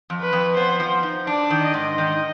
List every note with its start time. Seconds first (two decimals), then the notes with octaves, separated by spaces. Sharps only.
0.10 F2
0.20 B4
0.33 F2
0.56 B3 C5
0.80 F3
1.03 D#4
1.27 D4 D5
1.50 D#3
1.63 D#5
1.74 G#2
1.98 D#3